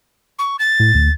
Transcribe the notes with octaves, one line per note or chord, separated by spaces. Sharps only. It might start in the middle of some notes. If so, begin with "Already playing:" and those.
C#6
A6
A2
D2